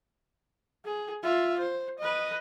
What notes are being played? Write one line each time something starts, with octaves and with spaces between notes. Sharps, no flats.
G#4
F4 E5
C5
B4 D#5